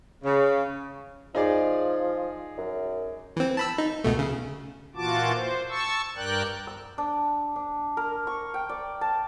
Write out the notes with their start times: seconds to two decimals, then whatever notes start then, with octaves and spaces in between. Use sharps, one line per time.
0.24 C#3
1.35 F3 D#4 G#4 D5
2.58 F#2
3.36 E3 C4
3.57 A5 B5 E6
3.78 D#4
4.04 C#2 B2 A3
4.19 C#3
4.95 A#2 E3 F4 F#4 A5 D6
5.34 C5
5.69 A5 C#6 E6
6.16 G2 A#4 D5 G5 F#6
6.67 E6
6.98 D4
7.56 D4
7.97 A#4
8.27 C#6
8.54 G5
8.69 D5
9.01 A5